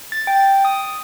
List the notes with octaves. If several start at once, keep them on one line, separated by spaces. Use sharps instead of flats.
A6
G5
D#6